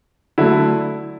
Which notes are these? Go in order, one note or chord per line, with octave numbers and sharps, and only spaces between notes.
D3 F#3 A3 E4